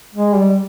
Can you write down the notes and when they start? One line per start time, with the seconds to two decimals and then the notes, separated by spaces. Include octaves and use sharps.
0.15 G#3
0.36 G3